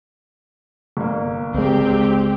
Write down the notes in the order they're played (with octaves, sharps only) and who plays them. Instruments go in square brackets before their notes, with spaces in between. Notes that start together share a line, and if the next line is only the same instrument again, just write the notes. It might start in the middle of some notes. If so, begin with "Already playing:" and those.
[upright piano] G1 A#3
[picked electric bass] C#2 G#3 [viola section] C4 G4